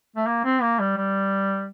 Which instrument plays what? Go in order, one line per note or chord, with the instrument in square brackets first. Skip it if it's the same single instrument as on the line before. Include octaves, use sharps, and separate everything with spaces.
[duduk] A3
A#3
C4
A#3
G3
G3